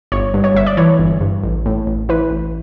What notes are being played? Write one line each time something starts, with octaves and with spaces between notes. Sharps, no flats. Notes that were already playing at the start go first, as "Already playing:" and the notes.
G1 C#5
G2
C#5
G1 E5
D5
E3 C#5
G1
G2
A1
A2
A1
E3 B4
A1